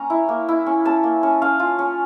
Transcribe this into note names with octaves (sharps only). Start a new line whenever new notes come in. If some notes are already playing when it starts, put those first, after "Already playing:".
Already playing: A#3 C#4 A#5
E4
A#3
E4
C#4
C#4 A5
A#3
C#4
C#4 F5
F4
C#4